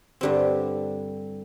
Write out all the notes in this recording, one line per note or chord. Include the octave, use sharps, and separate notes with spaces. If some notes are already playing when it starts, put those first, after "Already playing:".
G2 D3 G3 C4